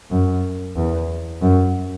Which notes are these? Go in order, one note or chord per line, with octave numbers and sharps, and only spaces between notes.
F#2
E2
F#2